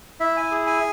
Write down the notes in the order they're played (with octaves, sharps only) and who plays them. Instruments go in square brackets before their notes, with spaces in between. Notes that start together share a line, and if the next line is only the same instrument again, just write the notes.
[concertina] E4 E5
G#5
G#4
G#5